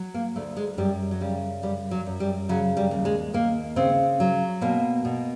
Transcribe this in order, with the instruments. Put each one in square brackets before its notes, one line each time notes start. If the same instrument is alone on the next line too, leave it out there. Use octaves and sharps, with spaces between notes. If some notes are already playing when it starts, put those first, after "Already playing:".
Already playing: [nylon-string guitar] F#3
A#3
D2 A3
G#3
F#2 G3
F#3
C#3 G3
F#2 G3
F#3
F#2
G3
C#3 F#3
G3
D#2
G#3
D#2 A#3
C#3 C4
F#3
B2 A#3
B2